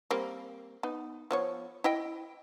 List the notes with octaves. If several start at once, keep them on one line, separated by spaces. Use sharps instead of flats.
G3 A#3 C4
B3 D#4
F3 B3 C#5
E4 D#5 G5